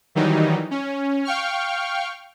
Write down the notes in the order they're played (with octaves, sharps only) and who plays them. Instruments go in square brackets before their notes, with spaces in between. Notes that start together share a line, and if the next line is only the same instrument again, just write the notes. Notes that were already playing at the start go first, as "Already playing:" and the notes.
[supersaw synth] D#3 E3 F#3 G3 D#4
C#4
F5 G5 C#6 F6